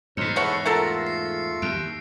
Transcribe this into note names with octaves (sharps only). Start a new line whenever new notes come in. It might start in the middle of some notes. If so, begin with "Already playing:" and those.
E2 G#2 D#4 C5 C#5 C7 C#7
A3 E4 C#5 F#5
A3 F4 A4 A#4 F#5 E6 A#6
C7
D#2 D7